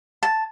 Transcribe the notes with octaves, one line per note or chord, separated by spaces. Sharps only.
A5